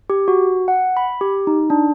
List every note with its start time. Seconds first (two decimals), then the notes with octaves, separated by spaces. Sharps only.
0.10 G4
0.28 F#4
0.68 F#5
0.97 B5
1.21 G4
1.47 D#4
1.70 D4